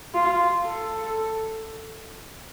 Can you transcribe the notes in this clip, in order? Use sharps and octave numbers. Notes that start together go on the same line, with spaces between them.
F4
A4